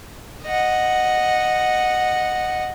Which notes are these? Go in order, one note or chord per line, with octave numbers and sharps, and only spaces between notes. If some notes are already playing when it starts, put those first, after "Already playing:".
D#5 F#5